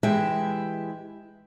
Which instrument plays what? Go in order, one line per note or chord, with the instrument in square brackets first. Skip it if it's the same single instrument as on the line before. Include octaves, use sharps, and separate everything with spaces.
[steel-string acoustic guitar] E3 G#3 E4 G4 E5 G5